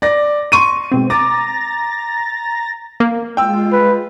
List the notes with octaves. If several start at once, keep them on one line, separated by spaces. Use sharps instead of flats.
D5 A#6
C6 C#6 D#7
G#2 B2 C4
A#5 D6 A6 A#6
A#3
G#3 F4 G5 E6
B4